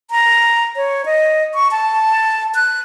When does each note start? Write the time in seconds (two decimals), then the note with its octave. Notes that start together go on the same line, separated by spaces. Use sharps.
0.11 A#5
0.76 C#5
1.06 D#5
1.54 C#6
1.71 A5
2.55 F#6